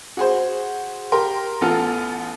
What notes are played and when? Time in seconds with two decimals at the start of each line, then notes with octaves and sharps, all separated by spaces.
0.17 F#4 G#4 C5
1.12 G4 A#4 C6
1.61 A1 B3 F4 A4 F6